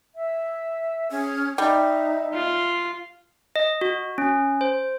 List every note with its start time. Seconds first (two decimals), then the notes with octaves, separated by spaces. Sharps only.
0.15 E5
1.11 C#4 G#4
1.58 G3 D#4 E5
2.34 F4
3.56 D#5
3.81 F#4
4.18 C#4
4.61 C5